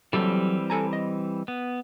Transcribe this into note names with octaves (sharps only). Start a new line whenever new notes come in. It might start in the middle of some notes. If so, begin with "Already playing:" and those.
E3 F#3 G3 C4 G4 A4
A4 G#5 A#5
D#5
B3